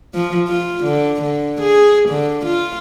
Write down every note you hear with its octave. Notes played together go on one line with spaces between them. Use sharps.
F3
F4
D3
D3
G#4
D3
F4